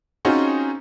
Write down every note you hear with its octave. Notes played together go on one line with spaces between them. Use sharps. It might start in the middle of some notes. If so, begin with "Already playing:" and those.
C4 C#4 D#4 F4 F#4 G#4